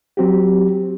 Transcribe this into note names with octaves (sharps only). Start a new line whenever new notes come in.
F#3 C4 F#4 G4